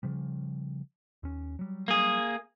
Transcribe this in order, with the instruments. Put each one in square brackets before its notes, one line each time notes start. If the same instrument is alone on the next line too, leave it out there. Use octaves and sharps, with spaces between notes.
[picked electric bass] C#3 F3 G3
D#2 C#4
F#3 G3
[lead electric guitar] A#3 G#4